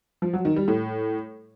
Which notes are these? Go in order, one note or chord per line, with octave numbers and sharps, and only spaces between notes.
F3
F#3
D#3
G3
A2